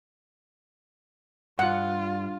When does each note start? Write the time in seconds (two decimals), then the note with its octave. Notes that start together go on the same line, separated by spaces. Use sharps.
1.59 G2 F4 F#5